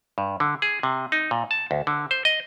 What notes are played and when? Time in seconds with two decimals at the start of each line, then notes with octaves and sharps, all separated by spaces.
0.18 G2
0.40 D3
0.62 G#4
0.83 C3
1.12 D#4
1.31 A#2
1.51 A5
1.71 D2
1.87 D3
2.11 C5
2.25 D#5